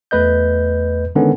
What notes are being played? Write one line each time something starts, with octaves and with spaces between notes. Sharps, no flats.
E2 A3 B4 D#5 G6
D3 D#3 G#3 B3 C#4